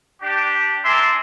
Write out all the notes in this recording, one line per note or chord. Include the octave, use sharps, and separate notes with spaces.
D4 G4
D4 A#4 D5 E5 G#5 C6